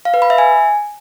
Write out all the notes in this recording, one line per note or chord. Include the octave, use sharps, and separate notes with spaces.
F5
B4
B5
E5
G#5